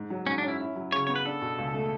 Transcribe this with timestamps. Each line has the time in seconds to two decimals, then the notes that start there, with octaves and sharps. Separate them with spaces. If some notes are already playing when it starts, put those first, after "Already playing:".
Already playing: G#2
0.10 F#3
0.26 G#2 C#4
0.38 D4
0.43 C#4
0.48 E4
0.60 E4
0.76 F#3
0.92 C#3 C#5
1.07 B3 C#5
1.15 B4
1.25 D4 A4
1.42 B2
1.59 C#2
1.74 A3